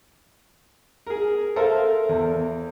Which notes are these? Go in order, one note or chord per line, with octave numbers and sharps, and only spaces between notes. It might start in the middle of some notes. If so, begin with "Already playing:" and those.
G#4 A#4
A4 A#4 C5 E5 F5
E2